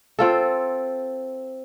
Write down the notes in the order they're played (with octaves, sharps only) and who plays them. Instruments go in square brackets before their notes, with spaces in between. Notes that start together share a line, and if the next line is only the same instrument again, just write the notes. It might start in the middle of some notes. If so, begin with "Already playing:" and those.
[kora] C4 F4 A4